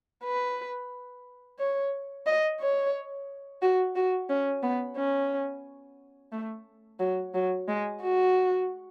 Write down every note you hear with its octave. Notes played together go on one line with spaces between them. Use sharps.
B4
C#5
D#5
C#5
F#4
F#4
C#4
B3
C#4
A3
F#3
F#3
G#3
F#4